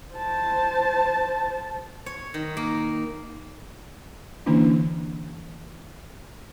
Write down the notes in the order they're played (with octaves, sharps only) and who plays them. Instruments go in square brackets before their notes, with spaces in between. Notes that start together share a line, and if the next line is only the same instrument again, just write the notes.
[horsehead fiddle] C5 A5
[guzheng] C#5
D#3
A#3
[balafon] D3 E3 A#3 C#4 D4 E4